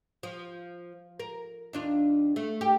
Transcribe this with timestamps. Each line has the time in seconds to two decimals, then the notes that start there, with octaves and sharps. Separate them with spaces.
0.23 F3
1.20 A#4
1.73 D#2 D4 F4
2.36 A3
2.61 G4